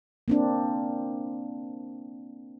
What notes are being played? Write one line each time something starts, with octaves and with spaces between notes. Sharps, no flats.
A#3 C4 D4